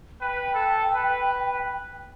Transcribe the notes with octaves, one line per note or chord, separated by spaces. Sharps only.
B4 G5
A4
B4